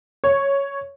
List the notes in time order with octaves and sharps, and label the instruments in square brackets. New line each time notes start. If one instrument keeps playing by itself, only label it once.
[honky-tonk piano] C#5